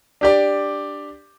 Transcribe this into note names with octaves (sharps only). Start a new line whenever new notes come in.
D4 G4 D5